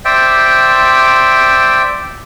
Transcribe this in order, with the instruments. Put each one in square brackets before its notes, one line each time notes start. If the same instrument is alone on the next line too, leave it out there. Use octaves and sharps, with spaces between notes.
[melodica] C5 D5 E5 G5